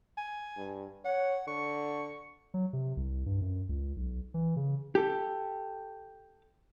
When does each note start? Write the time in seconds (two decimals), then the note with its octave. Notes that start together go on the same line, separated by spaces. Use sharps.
0.17 G#5
0.57 G2
1.05 C#5 F#5
1.47 D3 C#6
2.54 F#3
2.73 C3
2.97 C2
3.26 G2
3.42 F#2
3.69 C#2
3.96 B1
4.34 E3
4.56 C#3
4.95 G4 A4